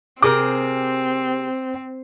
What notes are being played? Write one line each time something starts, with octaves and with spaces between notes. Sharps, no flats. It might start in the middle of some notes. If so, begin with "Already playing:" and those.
C3 C4 G#4 A#4 D6